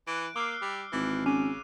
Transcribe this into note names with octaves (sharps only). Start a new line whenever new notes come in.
E3 F#6 D7
A#3 D6 E6 F6 C7
G3
G#1 E3
C#3 C#4 D6 D#7